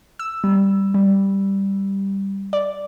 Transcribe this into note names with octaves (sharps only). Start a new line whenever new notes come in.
E6
G3
G3
D5